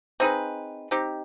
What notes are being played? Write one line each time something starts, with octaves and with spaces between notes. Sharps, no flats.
C4 D#4 G#4 B4
C4 D#4 G4